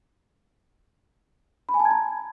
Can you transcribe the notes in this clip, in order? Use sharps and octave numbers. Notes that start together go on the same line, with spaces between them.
B5
G#5
A5
G#6
A#5